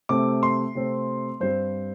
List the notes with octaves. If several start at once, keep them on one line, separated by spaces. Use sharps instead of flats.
C3 A3 C4 D6
C6
C3 A3 C4
G2 G3 C4 C5